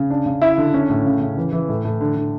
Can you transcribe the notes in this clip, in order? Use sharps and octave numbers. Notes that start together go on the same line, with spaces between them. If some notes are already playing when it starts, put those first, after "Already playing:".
Already playing: C#3
D4
C#3
E4
D3
C#4
A2
C#3
C#3
E3
E3
A2
A2
D3
D3